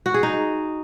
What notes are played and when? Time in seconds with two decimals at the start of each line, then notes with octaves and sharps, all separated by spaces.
0.06 F#4
0.14 G#4
0.23 D#4